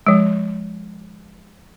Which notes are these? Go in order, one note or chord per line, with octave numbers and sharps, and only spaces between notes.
F3 G#3